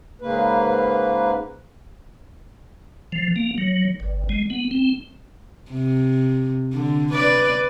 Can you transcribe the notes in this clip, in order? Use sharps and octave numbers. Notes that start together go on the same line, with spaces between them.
G#2 C#3 A#3 B4
F3
A#3
F#3
G1
G#3
B3
C4
C3
D3
B4 D5